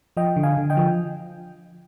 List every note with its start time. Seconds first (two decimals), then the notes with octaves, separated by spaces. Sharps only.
0.17 F3 D#5 G5
0.36 D3
0.43 F5 G#5
0.57 D3
0.70 D#5 G5
0.77 F3